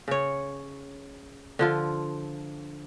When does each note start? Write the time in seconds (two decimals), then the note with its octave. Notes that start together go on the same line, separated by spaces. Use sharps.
0.08 C#3 C#5
1.59 D3 F3 F4